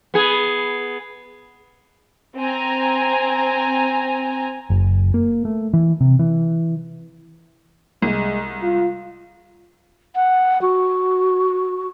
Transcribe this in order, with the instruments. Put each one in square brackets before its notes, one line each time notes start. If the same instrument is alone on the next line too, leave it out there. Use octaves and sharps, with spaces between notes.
[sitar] B3 G#4
[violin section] C4 G#5 A#5
[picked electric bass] F#1
A#3
A3
E3
C3
E3
[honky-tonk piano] C2 [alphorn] G#3
[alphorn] F4
[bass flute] F#5
F#4